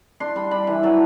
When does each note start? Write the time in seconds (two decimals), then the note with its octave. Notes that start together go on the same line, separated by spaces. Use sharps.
0.20 D4 C6
0.36 G3 B5
0.51 D4 B5
0.67 E3
0.83 F#3 A5